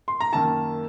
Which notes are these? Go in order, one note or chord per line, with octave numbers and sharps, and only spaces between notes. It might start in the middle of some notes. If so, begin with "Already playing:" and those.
C6
A#5
F#2 D#3 A#3 A5